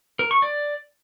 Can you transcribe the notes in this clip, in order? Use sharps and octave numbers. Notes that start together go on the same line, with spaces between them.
A#4
C#6
D5